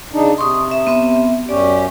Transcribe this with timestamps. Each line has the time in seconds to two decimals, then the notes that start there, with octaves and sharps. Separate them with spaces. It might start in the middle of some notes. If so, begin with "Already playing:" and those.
0.13 C#3 D4 D#4
0.38 C3 C6 C#6 D#6
0.71 E5
0.87 B3 C4 E5
1.49 F#2 C#4 G4 D5